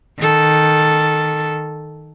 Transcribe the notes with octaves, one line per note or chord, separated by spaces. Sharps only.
D#3 A4